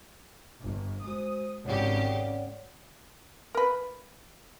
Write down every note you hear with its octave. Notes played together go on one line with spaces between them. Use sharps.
G1
G#3 F#4 C5 D#6
G#1 C#3 G4 C#5 D5 F#5
A#4 B4